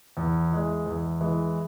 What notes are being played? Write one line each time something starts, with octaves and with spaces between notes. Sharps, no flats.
E2
E3 G#3
E2
E3 G#3